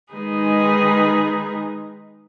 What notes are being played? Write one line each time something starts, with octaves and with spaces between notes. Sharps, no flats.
D#3 G#3 D#4 G#4 B4